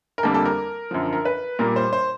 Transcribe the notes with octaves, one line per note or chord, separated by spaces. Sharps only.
A#4
F2 D3 G3 A#3 A4
A4
A#4
F#2 D3 F3
A#4
B4
A#2 G3 A#3 A#4
C5
C5